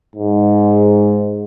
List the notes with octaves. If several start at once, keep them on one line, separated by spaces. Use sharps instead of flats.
G#2